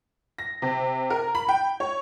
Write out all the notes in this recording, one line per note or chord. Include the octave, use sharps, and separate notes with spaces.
A#6
C3
A#4
B5
G5
C#5